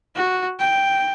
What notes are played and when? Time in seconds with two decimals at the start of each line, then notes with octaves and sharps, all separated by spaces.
0.15 F#4
0.59 G5